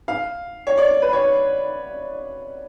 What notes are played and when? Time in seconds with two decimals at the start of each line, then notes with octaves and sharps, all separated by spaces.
0.08 F5
0.67 C#5
0.77 D5
1.02 B4
1.13 C#5